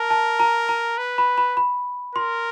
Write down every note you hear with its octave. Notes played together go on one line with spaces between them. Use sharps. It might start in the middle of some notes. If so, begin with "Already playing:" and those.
Already playing: A#4 A5
A5
A#5
A#5
B4
B5
B5
B5
A#4 C6